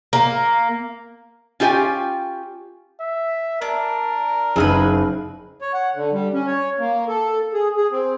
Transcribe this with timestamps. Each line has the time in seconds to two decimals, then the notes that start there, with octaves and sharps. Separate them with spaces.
0.13 A#3
1.60 C#4 F4 G4 C#5 G5 G#5
3.01 E5
3.62 D4 A#4
4.56 F#1 C4 D#4 G#4 B4 F6
5.62 C#5
5.74 F#5
5.95 D3
6.13 G3
6.34 C#4
6.47 C#5
6.79 A#3
7.08 A4
7.54 G#4
7.77 G#4
7.92 C4